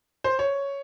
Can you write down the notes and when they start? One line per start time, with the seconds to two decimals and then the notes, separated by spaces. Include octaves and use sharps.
0.24 C5
0.39 C#5